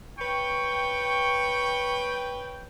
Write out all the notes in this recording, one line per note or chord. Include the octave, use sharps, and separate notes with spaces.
B4 C#5 G5 C#6